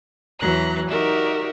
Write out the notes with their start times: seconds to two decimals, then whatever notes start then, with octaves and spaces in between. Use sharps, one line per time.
0.39 E2 E3 F#3 A#5 F#6
0.89 D#4 F#4 G4 A#4 D5 E5